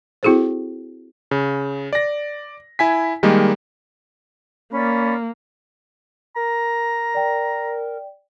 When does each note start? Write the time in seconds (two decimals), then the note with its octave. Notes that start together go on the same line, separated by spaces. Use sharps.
0.23 C4 E4 F#4 G#4 A4 C5
1.31 C#3
1.93 D5 A#6
2.79 E4 G#5 B6
3.23 D#3 G3 G#3 A#3
4.73 A#3 C#4 D5 B5
6.36 A#4 A#5
7.15 D5 G5